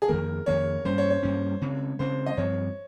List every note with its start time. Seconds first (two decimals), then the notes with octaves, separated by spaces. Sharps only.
0.02 G#4
0.08 F2 D#3 A#3 A#4
0.46 F2 D#3 A#3 C#5
0.85 G2 G3 A#3 C#4 C5
0.98 C#5
1.10 C#5
1.23 G2 G3 A#3 C#4
1.61 C#3 G#3 C4
1.99 C#3 G#3 C4 C5
2.26 D#5
2.37 G2 F3 C4 C#5